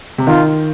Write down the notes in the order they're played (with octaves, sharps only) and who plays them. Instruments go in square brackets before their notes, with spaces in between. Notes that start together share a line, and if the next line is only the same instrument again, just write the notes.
[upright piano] C3
[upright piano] D#3 [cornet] F4